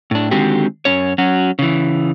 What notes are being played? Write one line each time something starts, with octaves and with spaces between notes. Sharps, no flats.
A2 D4
D3 D#3 G#3 C4 F#4 G4
F#2 C#4 C#5
F#3 C#4 F#4
C#3 E3